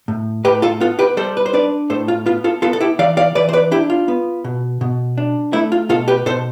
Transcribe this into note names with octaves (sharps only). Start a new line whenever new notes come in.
A2
A2 G4 B4
F4 A4
B3 F4 A4
G4 B4
G3 A4 C5
B4
C5
D4 B4 D5
A2 A4 C5
F4
B3 F4
F4 A4
B3 F4 A4
A4
E4 G4
E3 D5 F5
D5 F5
E3 B4 D5
C5
B4 D5
D4 E4 G4
F4
B3
B2
B2
D4
A3 E4
F4
B2 F4 A4
G4 B4
B2 A4 C5